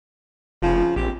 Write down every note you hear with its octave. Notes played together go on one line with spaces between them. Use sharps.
F1 C#3 F3
A#1 C4 G4